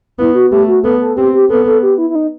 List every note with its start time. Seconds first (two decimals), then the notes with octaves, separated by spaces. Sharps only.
0.19 B3 E4
0.35 F#4
0.51 A3 G4
0.68 F#4
0.84 B3 A4
1.01 A4
1.16 C4 G4
1.34 G4
1.50 B3 A4
1.66 A4
1.83 G4
1.98 E4
2.10 E4
2.15 D#4